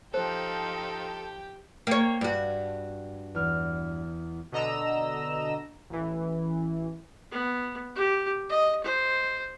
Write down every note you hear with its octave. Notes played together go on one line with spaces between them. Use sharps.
F3 D#4 G4 A4 C5 G5
A#3 C#5 G5
G2 F#4
E2 F6
B2 D3 D#5 A#5 E6 E7
A1 E3
B3
G4
D#5
C5